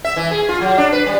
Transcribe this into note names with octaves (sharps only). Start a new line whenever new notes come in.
E5
E3
G#4
F4
F#3
D4
B4
G3